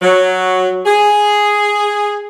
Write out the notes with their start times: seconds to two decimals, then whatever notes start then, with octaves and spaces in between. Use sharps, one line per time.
0.02 F#3
0.86 G#4